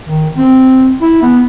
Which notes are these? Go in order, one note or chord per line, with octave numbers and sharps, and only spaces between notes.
D#3
C4
E4
B3